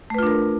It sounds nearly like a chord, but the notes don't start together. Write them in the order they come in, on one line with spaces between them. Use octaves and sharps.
A3 B4 F4 D4 A#4